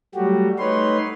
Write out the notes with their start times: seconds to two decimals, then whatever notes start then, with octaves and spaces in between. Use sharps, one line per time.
0.15 F#3 G3 A3 F#4 G4
0.59 A3 D#4 B4 C#5 C6